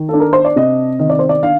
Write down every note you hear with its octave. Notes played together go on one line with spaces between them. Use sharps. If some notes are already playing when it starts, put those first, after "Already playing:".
Already playing: D#3
D4 A4
A#4
C5
D5
C3 D#5
D#3 D#5
D5
C5
D5
D4 F5